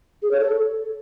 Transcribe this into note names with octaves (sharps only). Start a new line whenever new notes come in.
G#4
C#5
A4